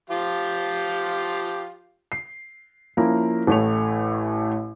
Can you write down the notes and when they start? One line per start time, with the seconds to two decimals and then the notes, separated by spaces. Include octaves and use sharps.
0.10 F3 F4 G4
2.12 C7
2.97 F3 A#3 C#4 E4 A#4
3.47 A1 A2 A3 C#5 F7